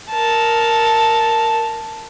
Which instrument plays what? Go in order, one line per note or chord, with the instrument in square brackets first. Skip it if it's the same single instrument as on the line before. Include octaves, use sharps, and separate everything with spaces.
[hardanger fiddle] A#4 A5